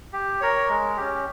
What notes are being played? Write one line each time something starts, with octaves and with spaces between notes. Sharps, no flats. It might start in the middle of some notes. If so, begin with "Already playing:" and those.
G4
A#4 C#5
G#3
C#4 G4